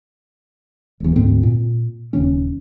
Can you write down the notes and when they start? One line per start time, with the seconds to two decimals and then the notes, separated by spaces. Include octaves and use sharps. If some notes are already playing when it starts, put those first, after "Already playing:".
1.00 E1 E2
1.16 D2 G#2 C4
1.43 A#2
2.13 D#1 D#2 C#3 C#4